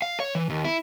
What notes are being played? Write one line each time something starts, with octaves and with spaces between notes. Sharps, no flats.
F5
C#5
E3
D#2
E4